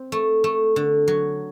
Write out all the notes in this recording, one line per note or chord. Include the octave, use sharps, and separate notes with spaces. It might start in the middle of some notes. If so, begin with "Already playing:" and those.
Already playing: C4
A3
A3
D3
F#3